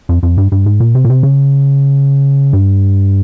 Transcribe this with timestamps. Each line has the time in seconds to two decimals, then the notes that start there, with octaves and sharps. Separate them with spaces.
0.09 F2
0.23 F2
0.38 G2
0.52 G2
0.66 G#2
0.80 A#2
0.95 C3
1.05 A#2
1.10 C3
1.23 C#3
2.53 G2